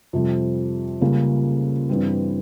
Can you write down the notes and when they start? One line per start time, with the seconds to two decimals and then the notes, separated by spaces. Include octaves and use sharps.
0.13 F2 C3 G3
1.01 C#2 C#3 G3 A#3 C#4
1.89 G2 E3 G3 C4